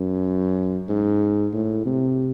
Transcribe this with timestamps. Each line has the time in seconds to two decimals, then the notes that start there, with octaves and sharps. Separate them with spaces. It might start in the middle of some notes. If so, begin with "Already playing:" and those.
Already playing: F#2
0.89 G#2
1.53 A2
1.86 C3